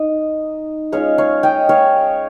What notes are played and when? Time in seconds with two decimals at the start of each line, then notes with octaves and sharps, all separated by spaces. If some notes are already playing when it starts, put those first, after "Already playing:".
Already playing: D#4 D#5
0.92 G#3 C#4 F4 C#5 F5
1.18 C#5 F5
1.43 D#5 G5
1.69 C#5 F5